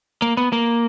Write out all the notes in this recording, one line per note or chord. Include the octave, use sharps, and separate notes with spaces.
A#3
B3
A#3